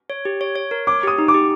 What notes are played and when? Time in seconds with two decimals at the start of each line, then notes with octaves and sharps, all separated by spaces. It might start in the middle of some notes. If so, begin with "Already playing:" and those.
0.10 C#5
0.25 G4
0.41 C#5
0.56 C#5
0.71 A#4
0.87 C#5 D6
1.03 G4 D#6
1.18 D#4
1.28 D6
1.34 G4